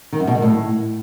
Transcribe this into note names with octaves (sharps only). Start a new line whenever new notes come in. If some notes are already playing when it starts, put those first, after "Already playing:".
D#3
F#2
B2
D#3
A2